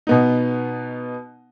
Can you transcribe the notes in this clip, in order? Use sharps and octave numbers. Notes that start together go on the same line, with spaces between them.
B2 B3 D#4